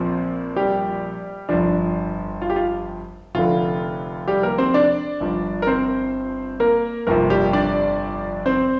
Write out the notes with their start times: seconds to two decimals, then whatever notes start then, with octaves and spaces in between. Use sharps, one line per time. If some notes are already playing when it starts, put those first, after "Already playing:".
Already playing: A#1 A#2 F3 C4
0.56 G3 G4
1.49 G1 F2 F3 D4
1.63 D4
2.42 F4
2.50 G4
2.56 F4
3.35 F1 F2 D3 F4
4.28 G3 G4
4.43 A#3 A#4
4.58 C4 C5
4.74 D4 D5
5.20 G1 G2 F3
5.62 A#4
5.67 C4 C5
6.60 A#3 A#4
7.07 G1 F2 C3 F3 A#3 A#4
7.30 G3 G4
7.53 D4 D5
8.46 C4 C5